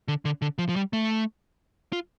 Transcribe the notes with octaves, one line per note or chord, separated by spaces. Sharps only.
D3
D3
D3
F3
F3
G3
A3
F4